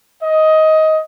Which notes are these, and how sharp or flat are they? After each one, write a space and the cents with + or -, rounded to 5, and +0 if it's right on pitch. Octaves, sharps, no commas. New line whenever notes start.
D#5 +15